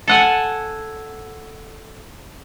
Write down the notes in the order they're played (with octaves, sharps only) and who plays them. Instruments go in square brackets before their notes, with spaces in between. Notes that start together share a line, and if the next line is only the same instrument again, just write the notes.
[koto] A4 F#5 G#5